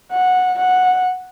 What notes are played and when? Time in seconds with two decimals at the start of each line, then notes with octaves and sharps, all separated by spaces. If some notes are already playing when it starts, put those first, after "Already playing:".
0.12 F#5
0.59 F#5